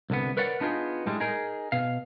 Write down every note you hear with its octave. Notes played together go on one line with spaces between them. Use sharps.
C2 D3 B3
A#4 B4 C#5 D5 F#5
B3 D4 D#4 F4 G#4
A2 G3 G#3
D#4 G#4 A#4
B2 F5